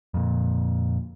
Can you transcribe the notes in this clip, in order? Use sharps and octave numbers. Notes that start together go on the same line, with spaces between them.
F2 A#2